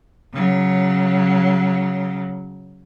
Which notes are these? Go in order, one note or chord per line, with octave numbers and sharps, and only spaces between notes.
C#3 F#3